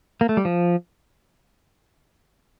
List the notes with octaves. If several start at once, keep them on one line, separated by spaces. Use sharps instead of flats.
A#3
A3
G3
F3